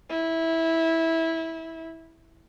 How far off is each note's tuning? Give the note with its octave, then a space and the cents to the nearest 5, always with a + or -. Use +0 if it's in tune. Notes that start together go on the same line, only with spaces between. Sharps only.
E4 -15